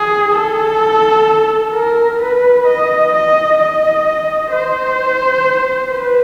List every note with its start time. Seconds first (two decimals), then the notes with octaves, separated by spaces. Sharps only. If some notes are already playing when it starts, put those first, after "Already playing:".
Already playing: G#4
0.35 A4
1.74 A#4
2.20 B4
2.66 D#5
3.13 D#5
3.59 D#5
4.51 C5
5.90 B4